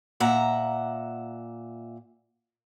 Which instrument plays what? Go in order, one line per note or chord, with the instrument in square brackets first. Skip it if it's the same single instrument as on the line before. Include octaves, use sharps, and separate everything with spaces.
[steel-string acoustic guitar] A#2 E5 F#5 A#5